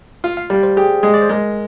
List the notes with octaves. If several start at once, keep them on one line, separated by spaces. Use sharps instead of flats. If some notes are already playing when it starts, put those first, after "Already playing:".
F4 F5
F5
G3 D5
C5
G4 G#4
G#3 G#4
D5
C5
G#3 A#4